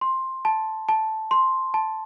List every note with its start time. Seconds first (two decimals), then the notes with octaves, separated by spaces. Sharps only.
0.01 C6
0.45 A5
0.89 A5
1.31 C6
1.74 A5